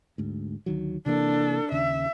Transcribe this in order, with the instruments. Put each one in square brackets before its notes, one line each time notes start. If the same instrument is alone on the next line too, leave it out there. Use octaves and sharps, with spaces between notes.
[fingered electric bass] D2 G#2
D2 D#3 F#3
[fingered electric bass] C3 E3 A#3 [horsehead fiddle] D4 A4
[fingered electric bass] D#2 C#3 [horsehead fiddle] E5